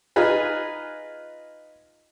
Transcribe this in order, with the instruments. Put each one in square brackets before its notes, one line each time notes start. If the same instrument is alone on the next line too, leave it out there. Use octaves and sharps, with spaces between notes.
[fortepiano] D#4 F4 G#4 B4